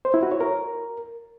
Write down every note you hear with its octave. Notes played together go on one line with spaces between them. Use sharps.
C5
E4
F#4
C#5
A#4